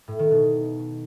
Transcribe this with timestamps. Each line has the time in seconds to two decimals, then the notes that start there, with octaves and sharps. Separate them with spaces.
0.08 A2
0.19 D#3
0.31 B2